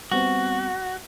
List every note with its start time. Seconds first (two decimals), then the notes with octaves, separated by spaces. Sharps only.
0.12 G3 B3 C4 F#4